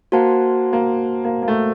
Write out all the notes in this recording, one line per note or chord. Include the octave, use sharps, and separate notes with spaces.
A#3 F#4 C5 F#5 A5
A#3
A#3
A#3
A3